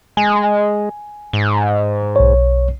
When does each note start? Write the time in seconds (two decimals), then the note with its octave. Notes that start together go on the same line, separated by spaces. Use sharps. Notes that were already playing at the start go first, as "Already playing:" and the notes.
0.17 G#3 G#5
1.33 G#2
2.16 B1 C#5